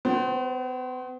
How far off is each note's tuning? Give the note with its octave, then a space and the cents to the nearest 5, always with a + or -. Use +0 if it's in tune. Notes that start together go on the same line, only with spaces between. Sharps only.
B3 +45 C5 +15